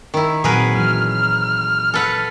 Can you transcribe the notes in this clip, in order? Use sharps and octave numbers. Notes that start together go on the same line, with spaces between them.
D#3 E4
A#2 F#3 C4 G#4 A#4 B4 F#5
E3 F#3 F6
F6
A4 B4 F#5